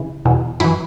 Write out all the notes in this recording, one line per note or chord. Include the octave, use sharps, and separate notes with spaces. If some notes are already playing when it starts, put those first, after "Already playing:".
Already playing: C#3 E3
E2 B2
F#2 E3 E4